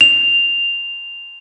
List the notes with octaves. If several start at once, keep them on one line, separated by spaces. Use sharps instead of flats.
F7